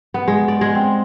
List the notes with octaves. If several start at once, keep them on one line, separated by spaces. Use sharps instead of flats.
B3
G#3
D5
G#3
C4